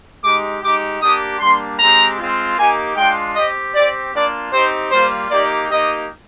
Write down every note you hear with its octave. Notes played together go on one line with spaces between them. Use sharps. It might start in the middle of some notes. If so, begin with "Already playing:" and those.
G#3 D#4 G4 D6
G#3 D#4 G4 D6
A#3 D4 G4 D#6
G3 A#3 D4 C6
G#3 C4 G4 A#5
G#3 C4 F4
A#3 D#4 G4 G#5
G#3 D4 F4 G5
C4 G4 D#5
C4 G4 D5
A#3 D4 F4 D5
C4 D#4 G4 C5
G3 A#3 F4 C5
A#3 D#4 G4 D5
A#3 D#4 G4 D#5